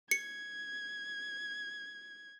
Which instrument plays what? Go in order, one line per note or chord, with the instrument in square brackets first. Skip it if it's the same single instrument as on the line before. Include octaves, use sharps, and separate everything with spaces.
[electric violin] G#6 [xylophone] C#7